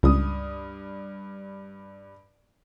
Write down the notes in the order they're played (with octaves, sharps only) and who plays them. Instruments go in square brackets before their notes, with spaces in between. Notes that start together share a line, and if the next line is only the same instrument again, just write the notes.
[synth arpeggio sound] C#2 [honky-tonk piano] G2 D#6